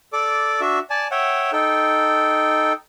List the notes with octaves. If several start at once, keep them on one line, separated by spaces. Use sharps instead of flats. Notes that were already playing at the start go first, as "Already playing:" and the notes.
A4 D5 D6
D4 F#4 E5
D5 G#5 A5
C#5 E5 F#5 G5
D#4 A4 G5